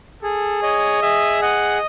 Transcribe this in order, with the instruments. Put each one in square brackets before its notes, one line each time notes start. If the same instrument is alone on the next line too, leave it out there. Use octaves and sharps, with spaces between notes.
[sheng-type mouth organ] G#4 [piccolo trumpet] A4
[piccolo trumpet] C#5 [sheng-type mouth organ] D#5
[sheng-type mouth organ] G#4 [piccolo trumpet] E5
[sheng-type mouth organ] D#5 [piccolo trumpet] F#5